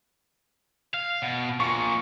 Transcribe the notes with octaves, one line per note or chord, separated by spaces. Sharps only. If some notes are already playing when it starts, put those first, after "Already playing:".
F5
B2
A#2 F3 C#6